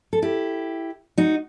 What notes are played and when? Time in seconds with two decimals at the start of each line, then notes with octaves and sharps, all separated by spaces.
0.13 A4
0.22 E4 G4
1.18 D#4 F#4